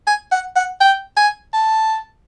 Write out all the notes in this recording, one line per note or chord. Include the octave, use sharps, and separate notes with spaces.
G#5
F#5
F#5
G5
G#5
A5